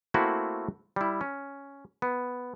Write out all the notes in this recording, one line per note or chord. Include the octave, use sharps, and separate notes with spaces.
A3 A#3 C4 E4 F#4
G3 E4
C#4
B3